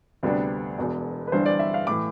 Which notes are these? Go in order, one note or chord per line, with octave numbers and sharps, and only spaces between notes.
D2 C3 G3 B3 D4
E1 E2 B2
B4
G1 G2 E3 G3 D4 C5
D5
E5
F5
A2 E3 D6